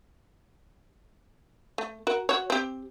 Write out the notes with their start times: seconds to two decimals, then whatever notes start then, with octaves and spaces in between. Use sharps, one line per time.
1.78 A3
2.07 F#4 A#4
2.29 F#4 C#5
2.50 C4 G4